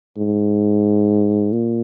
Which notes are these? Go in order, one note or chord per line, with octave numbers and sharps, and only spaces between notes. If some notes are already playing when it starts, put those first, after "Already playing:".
G#2
A#2